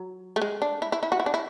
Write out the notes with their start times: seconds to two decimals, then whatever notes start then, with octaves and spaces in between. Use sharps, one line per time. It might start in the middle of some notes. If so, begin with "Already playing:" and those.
Already playing: F#3
0.36 A3
0.42 G#3
0.62 D4
0.82 E4
0.92 E4
1.03 E4
1.12 F#4
1.20 E4
1.26 D4
1.34 E4